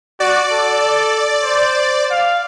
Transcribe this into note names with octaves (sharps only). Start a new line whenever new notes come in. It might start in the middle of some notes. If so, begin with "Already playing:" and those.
F#4 D5
A4
C5
F5